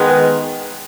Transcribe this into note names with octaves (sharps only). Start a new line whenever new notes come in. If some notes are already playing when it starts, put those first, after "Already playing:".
Already playing: D#3 G#3 B3